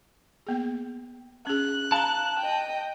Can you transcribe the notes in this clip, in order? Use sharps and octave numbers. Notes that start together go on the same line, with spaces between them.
A#3 B3 G#4
C#4 G#4 F#6
F5 A5 A#5
D#5 G5